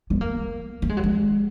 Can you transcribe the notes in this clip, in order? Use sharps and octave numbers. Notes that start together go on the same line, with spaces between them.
B3
A#3
A#3
G#3
F#3
G#3